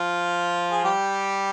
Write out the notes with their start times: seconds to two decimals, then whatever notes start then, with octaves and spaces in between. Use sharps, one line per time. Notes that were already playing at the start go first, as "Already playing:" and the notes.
Already playing: F3 F4
0.71 G#4
0.84 G3 G4